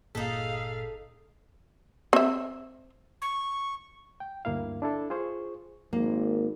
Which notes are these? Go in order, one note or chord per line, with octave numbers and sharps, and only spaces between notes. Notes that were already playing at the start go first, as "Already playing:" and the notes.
G1 A#2 D#4 G#4 A4 F5 B6
C4 E5
C#6
G5
D2 G2 A#3 E4 F5
D4 E4 A4
F4 G#4 C5 C#6
G#1 A#3